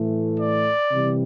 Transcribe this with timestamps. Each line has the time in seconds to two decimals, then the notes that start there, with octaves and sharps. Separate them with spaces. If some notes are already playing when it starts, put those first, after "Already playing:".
Already playing: A2 E3 A3
0.40 D5
0.90 C3 E3 G3